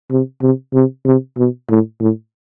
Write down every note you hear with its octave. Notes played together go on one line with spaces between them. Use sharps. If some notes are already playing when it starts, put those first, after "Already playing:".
C3
C3
C3
C3
B2
A2
A2